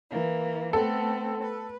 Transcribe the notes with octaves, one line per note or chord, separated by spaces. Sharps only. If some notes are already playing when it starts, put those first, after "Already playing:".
E3 A#3
A3 B3 C4 A4
B4